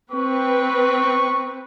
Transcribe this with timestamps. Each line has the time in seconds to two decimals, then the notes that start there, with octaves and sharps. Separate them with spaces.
0.12 C4 B4 C#6